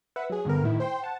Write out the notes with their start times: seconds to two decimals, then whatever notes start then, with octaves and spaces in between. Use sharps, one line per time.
0.16 B4 E5 F#5
0.30 F#3 G#4
0.45 G2 D3 B3 A#4
0.63 A2 D#3 E4
0.80 C5 G5 C6
1.03 F#5 A5